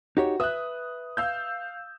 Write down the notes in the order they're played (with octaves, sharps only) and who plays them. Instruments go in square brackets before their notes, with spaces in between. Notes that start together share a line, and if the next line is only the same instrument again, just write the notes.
[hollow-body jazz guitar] D#4 G4 C#5 [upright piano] F#4
[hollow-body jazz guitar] B4 E5 [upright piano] D#6 F#6
[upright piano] F5 E6 G6